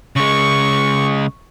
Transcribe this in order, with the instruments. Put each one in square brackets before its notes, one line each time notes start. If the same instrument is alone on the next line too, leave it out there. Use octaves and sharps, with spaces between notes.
[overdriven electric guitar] C#3 G#3 [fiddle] C#6